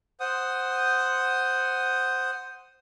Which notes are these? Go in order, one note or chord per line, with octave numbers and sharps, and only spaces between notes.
C5 F#5 D#6